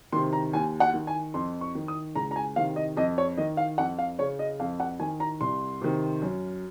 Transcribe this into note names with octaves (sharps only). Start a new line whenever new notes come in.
C3 D#3 C6
A#5
D#2 G#5
F#5
D#3
G#5
F2 C6
C#6
D#3
D#6
C#2 A#5
A#5
G#5
C3 D#3 F5
D#5
F2 D#5
C#5
D#3 D#5
F5
F2 F#5
F5
C#3 C#5
D#5
F2 F5
F#5
D#3 G#5
A#5
C2 C6
C3 D#3
F#2